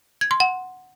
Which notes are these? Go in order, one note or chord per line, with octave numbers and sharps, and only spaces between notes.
G#6
C6
F#5